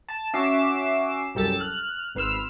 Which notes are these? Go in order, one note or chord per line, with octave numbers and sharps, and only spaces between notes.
A5
C#4 F#4 E5 D6 C7 E7
C2 F#2 G4 A4 E6 A6
F6 F#6
G#1 B4 C6 E6 F6